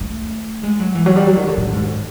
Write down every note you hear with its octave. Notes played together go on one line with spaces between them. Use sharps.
A3
G#3
F#3
E3
F#3
G3
F#3
D#3
D3
A2
G#2